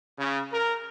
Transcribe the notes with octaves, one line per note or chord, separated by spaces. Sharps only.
C#3
A#4